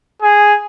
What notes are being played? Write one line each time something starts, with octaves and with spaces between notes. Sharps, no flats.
G#4